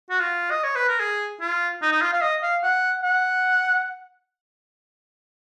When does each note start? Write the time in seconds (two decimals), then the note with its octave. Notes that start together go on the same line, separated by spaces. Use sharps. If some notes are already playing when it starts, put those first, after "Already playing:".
0.10 F#4
0.20 F4
0.51 D#5
0.64 C#5
0.75 B4
0.88 A#4
1.00 G#4
1.41 F4
1.82 D#4
1.92 D#4
2.01 F4
2.13 F5
2.22 D#5
2.43 F5
2.63 F#5
3.03 F#5